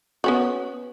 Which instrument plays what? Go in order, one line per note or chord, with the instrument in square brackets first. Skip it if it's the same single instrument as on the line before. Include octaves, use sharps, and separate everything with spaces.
[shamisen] B3 C#4 F#4